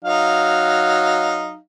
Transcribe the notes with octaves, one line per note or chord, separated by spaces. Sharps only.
F#3 D#4 F5